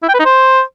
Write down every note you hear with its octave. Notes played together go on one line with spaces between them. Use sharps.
E4
G5
B4
D#4
C5